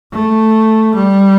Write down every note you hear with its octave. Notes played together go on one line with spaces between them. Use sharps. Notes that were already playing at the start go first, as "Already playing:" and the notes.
A3
G3